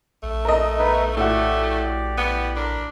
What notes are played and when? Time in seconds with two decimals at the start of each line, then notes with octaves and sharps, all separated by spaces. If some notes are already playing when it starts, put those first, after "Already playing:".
0.23 A#1 A3
0.45 A#4 D#5
0.78 B3 D#4 B4
1.17 A2 A3 F#4 G4 D5
2.17 B3
2.56 D4 A#4 B5